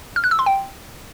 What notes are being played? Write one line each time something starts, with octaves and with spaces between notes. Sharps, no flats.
F6
F#6
E6
C6
G5